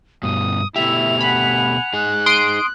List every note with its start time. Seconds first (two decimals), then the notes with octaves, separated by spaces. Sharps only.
0.23 G2 B2 D#6
0.76 B2 A3 E4 G4 E5 F7
1.21 F#5 G#5 B5
1.93 D#4 G#4 F#6
2.26 C6 D#6 D7